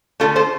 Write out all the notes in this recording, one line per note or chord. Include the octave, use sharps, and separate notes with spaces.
D3 A3 F4 A4
A4 C5